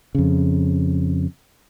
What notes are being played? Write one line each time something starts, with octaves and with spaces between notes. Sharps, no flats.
F2 C#3